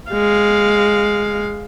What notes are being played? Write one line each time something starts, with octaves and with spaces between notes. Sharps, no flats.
G#3 F5